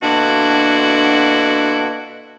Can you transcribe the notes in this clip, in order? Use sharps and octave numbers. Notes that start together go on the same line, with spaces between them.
B2 D3 A#3 D4 E4 F#4